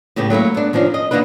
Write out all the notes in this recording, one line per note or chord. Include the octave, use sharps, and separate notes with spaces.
A2 C#3 A3 B3 G4
F#3 A3 A#3 E4
B3 D4
D#3 F3 C#4 D4
D#5
D#3 A#3 B3 D4 B4